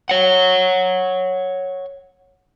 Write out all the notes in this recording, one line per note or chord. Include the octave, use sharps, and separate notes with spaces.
C#5 F#5